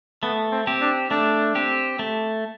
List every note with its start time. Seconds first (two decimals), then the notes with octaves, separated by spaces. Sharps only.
0.23 A3 B3
0.52 C4
0.67 C4 G4
0.81 D4
1.11 A3 D4
1.55 C4 G4
1.99 A3